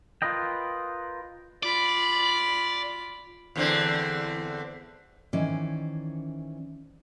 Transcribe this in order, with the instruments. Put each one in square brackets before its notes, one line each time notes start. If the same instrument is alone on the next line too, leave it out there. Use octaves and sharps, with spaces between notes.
[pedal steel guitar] F4 A#4 B4 D#5 G5
[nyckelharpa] F4 B5 [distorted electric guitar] D5
[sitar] E2 D3 C4
[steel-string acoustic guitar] D#3 E3 C#4 C5 D5